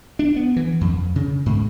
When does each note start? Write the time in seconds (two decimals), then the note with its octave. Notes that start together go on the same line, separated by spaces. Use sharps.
0.19 D4
0.36 B3
0.56 E3
0.81 F2
1.16 C#3
1.46 G#2